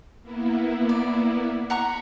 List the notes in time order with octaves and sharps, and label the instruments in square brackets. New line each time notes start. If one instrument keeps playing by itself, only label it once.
[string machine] A#3 B3 E4
[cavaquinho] D5
[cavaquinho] F#5 A#5 C#6 [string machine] B5